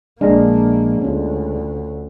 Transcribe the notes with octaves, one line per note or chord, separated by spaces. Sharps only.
A#1 G#3 A#3 D4 F5 A#5
D2 C#4 F4